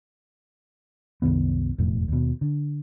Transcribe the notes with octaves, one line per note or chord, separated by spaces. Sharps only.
C2 F#2 D#3 B3
E1 F2 A2
D#2 B2
D3